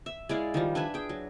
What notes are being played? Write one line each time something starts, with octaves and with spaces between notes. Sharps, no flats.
E5
G#3 E4 D5 F5
D#3 F3 G3
D4 B4 E5 G#5
G#4 G5
F#3